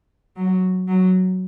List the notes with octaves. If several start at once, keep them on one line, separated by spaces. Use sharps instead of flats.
F#3
F#3